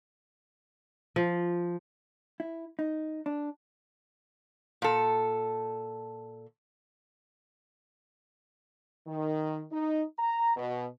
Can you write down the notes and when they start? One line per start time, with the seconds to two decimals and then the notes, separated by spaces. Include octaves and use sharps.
1.16 F3
2.40 E4
2.79 D#4
3.26 D4
4.82 A#2 A4
9.06 D#3
9.72 D#4
10.18 A#5
10.56 B2